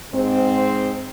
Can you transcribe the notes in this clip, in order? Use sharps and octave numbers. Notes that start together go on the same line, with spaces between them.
G#2 C4